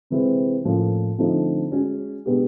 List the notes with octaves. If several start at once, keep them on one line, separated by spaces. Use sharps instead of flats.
C3 E3 G#3 C4
A2 F3 A#3 C#4
D3 F3 A3 C4 D#4
G#3 C#4 F#4
B2 G#3 B3 D4 G4